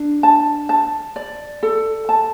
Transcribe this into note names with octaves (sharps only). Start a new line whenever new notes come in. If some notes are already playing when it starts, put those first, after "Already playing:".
Already playing: D4
A5
A5
D5
A4
A5